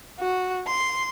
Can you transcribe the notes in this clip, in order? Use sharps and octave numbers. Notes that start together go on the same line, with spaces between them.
F#4
C6